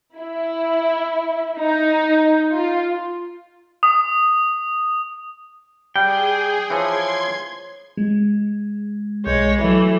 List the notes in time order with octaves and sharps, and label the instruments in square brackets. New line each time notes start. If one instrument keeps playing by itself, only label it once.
[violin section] E4
D#4
F4
[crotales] D#6
[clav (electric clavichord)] G3 [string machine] G#4 [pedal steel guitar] G5
[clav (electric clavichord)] E3 F3 [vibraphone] C#5 [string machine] C6 G#6
[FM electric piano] G#3
[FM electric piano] B1 G6 [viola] G#3 C#5
[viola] E3 A3 [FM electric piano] F#3 E5